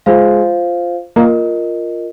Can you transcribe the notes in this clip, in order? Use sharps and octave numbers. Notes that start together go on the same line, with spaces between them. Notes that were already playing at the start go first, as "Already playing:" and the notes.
G#3 F4 C5 F5
A#3 F4 A#4 D#5